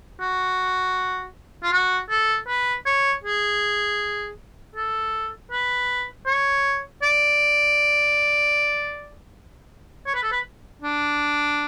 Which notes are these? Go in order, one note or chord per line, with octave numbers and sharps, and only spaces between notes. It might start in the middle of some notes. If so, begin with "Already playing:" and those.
F#4
F4
F#4
A4
B4
C#5
G#4
A4
B4
C#5
D5
C#5
B4
A4
B4
D4